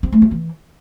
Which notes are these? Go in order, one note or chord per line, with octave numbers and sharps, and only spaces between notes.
C4
A3
F4
E3